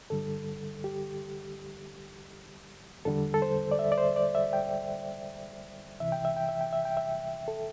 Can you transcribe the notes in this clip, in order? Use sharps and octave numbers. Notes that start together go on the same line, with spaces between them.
G2 D3 G3 A4
G4
E2 D3 G3 A4
A4
C5
D5
E5
D5
C5
D5
E5
G5
C2 C3 E3 E5
G5
E5
G5
E5
G5
E5
G5
E5
A4